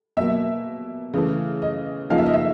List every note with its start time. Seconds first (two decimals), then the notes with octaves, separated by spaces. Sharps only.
0.17 B2 F#3 A#3 E5
1.14 C#3 E3 A3
1.62 D#5
2.10 C#3 F3 A#3 D#4 F5
2.18 E5
2.26 D#5
2.33 E5